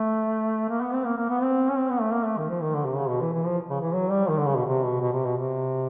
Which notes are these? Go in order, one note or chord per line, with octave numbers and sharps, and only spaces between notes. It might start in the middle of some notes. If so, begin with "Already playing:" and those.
Already playing: A3
A#3
B3
C4
A#3
A#3
B3
C4
C#4
C4
B3
A3
A#3
A3
D#3
F3
D#3
D3
C3
C#3
B2
E3
E3
F3
C#3
E3
F#3
G3
D#3
D3
C#3
B2
C3
B2
B2
C3
B2
C3